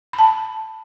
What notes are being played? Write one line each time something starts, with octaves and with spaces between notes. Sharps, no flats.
B5
A5